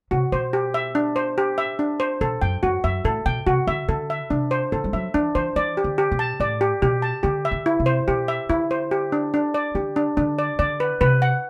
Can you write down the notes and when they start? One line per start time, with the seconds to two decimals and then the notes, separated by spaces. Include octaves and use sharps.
0.11 C3 F#4
0.32 B2 C5
0.53 G4
0.74 E5
0.95 D4
1.16 C5
1.38 G4
1.58 E5
1.79 D4
2.00 C5
2.21 B2 A4
2.42 F#2 G5
2.63 F#2 F#4
2.84 F#2 E5
3.04 A2 A4
3.26 B2 G5
3.47 C3 F#4
3.67 D3 E5
3.88 D3 A4
4.10 E5
4.30 C3 D4
4.51 C5
4.72 D3 A4
4.84 G3
4.93 F#3 E5
5.14 E3 D4
5.35 E3 C5
5.56 E3 D5
5.77 G4
5.84 D3
5.98 G4
6.12 B2
6.19 A5
6.40 A2 D5
6.61 G4
6.82 B2 G4
7.02 A5
7.23 D3 G4
7.45 E5
7.51 D3
7.66 E4
7.80 C3
7.86 C5
8.08 B2 G4
8.28 E5
8.49 D3 E4
8.71 C5
8.91 G4
9.12 D4
9.34 D4
9.54 D5
9.75 D3 G4
9.96 D4
10.17 D3 D4
10.39 D5
10.59 D3 D5
10.80 B4
11.01 C3 B4
11.22 F#5